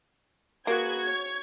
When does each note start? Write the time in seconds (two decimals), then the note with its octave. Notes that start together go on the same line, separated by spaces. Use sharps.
0.67 A#3 F#4 G#4 B4 G#6
1.06 C#5